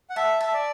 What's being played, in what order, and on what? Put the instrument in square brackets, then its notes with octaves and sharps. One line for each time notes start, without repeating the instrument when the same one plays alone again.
[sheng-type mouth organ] F#5
[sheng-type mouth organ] E5 [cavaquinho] A5
[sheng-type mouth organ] E5 [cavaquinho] A5
[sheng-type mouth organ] D5